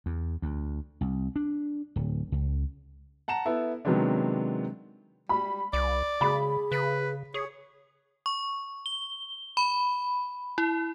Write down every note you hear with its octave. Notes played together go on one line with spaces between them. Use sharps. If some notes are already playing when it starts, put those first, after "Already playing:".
E2
D2
C2
D4
D1
C#2
F#5 A5 A#5 E7
B3 E4 A4
C3 D#3 F#3 G#3 B3 D4
G3 B5
C2 D5
C#3 G#4 B5
C#3 B4
G#4 C#5
C#6
G7
B5
E4